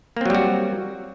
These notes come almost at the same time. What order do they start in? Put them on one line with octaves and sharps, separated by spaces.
A#3 C4 F#3 G3 F#4